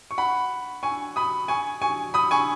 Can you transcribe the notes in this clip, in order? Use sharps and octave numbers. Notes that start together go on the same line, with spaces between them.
C#6
F#5 B5
G#5 C#6
B5 D#6
G#5 C#6
G#5 C#6
B5 D#6
G#5 C#6